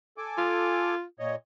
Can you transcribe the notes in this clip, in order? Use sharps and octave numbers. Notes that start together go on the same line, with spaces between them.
A4 G#5 D6
F4
A#2 C#5 D#5